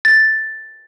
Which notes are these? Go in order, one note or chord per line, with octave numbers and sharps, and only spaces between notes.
A6